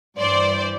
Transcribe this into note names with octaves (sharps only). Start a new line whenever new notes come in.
G2 E3 C5 D5